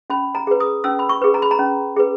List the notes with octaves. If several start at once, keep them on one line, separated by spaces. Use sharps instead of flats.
C#4 B5
A#5
G#4 B4
D#6
C#4 E6
B5
C#6
G#4 B4
A#5
B5
A#5
C#4
G#4 B4